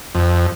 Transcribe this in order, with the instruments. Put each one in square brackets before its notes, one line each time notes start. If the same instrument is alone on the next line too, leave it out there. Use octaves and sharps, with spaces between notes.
[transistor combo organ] F2